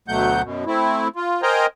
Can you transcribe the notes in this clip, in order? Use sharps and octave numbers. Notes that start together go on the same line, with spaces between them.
D2 B2 F#3 A3 F#5 G6
F#2 B2
A3 C4 E4
F4
A#4 C5 D#5 G5 G#5 A#5